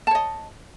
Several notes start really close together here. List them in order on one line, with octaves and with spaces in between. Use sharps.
A5 C#5 D#5